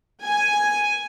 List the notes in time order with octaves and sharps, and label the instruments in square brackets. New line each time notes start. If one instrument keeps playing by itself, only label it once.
[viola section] G#5